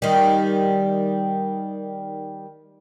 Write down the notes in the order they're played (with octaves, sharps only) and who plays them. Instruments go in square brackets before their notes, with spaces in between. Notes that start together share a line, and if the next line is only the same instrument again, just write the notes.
[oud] D#3 G3